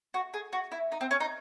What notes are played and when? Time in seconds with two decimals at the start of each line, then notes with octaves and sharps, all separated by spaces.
0.14 F#4
0.34 G#4
0.53 F#4
0.72 E4
0.92 D#4
1.01 C4
1.11 C#4
1.20 D#4